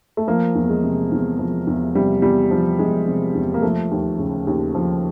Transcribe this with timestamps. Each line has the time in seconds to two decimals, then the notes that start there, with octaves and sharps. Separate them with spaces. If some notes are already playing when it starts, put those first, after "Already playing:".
0.17 A3
0.28 F3 A#3
0.55 E2
0.69 G#3
0.84 C3
1.12 E2
1.39 F3
1.67 E2
1.95 C3 G3
2.22 E2 G3
2.51 F3
2.79 E2 G#3
3.07 C3
3.35 E2
3.54 A#3
3.63 F3 A3
3.91 D#2
4.19 C#3
4.47 D#2
4.75 F3